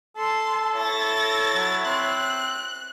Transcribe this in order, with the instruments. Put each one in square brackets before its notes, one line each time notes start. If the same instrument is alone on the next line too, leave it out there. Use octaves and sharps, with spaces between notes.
[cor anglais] A4 [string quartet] A5 C6
[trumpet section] E4 C#5 [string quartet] A6 A#6
[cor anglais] F#3
[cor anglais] C4 [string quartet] F#6